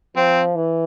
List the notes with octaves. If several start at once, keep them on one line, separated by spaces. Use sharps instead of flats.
F3 C4
E3